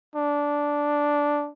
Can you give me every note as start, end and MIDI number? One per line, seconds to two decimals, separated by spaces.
0.15 1.50 62